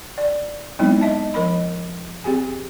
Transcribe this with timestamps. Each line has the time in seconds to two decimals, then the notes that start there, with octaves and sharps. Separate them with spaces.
0.18 D5
0.79 F#3 G#3 B3 C4 D#4 E4
1.01 D#5 E5 A5
1.34 F3 A#4 D#5 B5
2.24 C4 G4 G#4 G#5